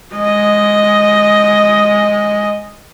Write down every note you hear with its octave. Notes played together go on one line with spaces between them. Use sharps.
G#3 D#5